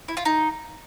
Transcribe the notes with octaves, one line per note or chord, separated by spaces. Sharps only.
E4
F4
D#4